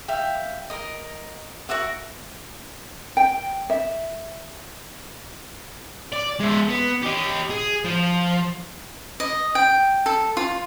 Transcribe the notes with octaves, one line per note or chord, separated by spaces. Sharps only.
E5 F5 G5
A#4 D#5
F#4 A#4 E5 F#5
G5
E5
D5
G#3 E5
B3
G4 D#5
G#4
F3
D#5
G5
A4
F4